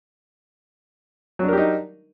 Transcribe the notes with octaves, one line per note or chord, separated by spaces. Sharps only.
F#3 D4 D#4 G4 A#4